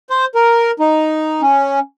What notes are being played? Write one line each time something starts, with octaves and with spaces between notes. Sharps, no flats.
C5
A#4
D#4
C#4